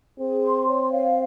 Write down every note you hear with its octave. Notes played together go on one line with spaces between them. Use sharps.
C4 G#4
C6
C#5
F5